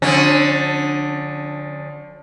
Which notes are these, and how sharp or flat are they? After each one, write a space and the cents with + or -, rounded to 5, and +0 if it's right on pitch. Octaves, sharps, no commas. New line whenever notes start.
D3 +0 F3 +30 C#4 -20